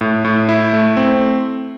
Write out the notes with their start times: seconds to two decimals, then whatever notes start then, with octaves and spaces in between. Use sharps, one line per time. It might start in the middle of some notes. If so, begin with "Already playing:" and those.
0.01 A2
0.25 A2
0.49 E4
0.73 A3
0.97 C4